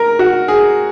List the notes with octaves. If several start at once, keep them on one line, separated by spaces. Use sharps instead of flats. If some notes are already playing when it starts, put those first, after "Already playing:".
Already playing: A#4
F#4
G#4